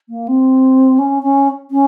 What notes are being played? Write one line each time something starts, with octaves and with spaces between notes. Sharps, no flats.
A#3
C4
C#4
C#4
C#4